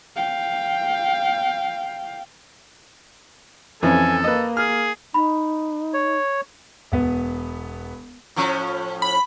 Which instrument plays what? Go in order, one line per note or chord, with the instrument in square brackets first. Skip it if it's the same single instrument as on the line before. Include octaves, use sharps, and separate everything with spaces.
[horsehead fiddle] F5 G5
[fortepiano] F2 E3 C#4 [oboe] A4 [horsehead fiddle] G#5
[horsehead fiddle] A#3 [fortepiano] B4 D#5
[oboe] G#4 [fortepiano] F6
[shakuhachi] D#4 [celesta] B5
[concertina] C#5
[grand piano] E1 B3
[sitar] A2 F3 C#4
[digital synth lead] B5